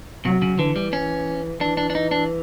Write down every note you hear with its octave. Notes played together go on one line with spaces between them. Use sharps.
C3 F#3
C#3
D3 E3
G3
C#4
E3 D4
D4
D4
D#4
D4